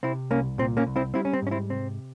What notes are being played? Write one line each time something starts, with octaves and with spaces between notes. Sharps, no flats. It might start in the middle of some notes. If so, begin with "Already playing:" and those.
C3 C4 E4
C2 A#3 C#4
A#2 C4
A#3 C#4
C2
C4 E4
G3 C4 E4
C#4
C4
G#2 C#4
C4 E4
C3 C4